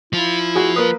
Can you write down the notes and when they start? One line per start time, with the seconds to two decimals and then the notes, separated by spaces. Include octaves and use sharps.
0.13 F3 E4 F4
0.55 F#4 G#4
0.76 A#3 B4 D#6